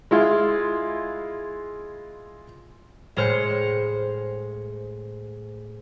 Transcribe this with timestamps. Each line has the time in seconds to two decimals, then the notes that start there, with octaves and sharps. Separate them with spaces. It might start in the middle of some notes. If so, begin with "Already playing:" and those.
0.11 G#3 E4 F4
3.16 A2 G#3 C5 F6 C#7